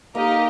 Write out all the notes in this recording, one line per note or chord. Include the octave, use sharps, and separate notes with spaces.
A#3 D#4 G4 A#4 D#5